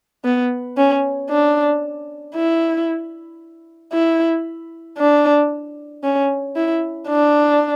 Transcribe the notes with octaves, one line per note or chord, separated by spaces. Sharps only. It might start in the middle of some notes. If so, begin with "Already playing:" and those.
B3
C#4
D4
E4
E4
D4
C#4
E4
D4